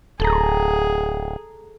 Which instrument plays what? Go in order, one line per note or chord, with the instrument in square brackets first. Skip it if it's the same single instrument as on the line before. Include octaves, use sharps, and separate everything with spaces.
[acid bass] D1 [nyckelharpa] G#4 [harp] A4 A#5